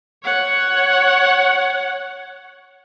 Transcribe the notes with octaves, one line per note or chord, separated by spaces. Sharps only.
C#5 F#5